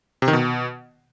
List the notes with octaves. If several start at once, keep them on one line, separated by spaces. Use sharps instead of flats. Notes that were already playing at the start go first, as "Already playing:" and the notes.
C3
D#3
B2